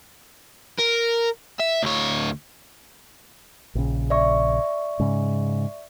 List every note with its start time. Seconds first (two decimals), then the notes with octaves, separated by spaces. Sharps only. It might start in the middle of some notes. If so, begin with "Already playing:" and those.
0.79 A#4
1.59 E5
1.83 D2 C#5
3.75 A#1 C#3
4.10 D5 E5 C#6
5.00 G#2 C#3